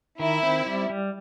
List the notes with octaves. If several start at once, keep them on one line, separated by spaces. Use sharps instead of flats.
D#3 E4
C4
G3
G3